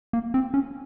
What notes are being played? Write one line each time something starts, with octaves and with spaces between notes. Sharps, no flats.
A#3
C4
C#4